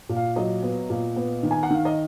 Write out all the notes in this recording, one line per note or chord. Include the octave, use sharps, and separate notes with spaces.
A#2
F5
F#3 D#5
B3
A#2
B3
D#3
G#5
F#5
D#3 F5
D#5